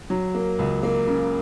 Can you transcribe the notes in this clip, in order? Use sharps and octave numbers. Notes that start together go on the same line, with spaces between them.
F#3
A#3
C#2
A#3
C#3